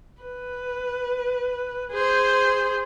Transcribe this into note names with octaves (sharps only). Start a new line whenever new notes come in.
B4
G#4 C5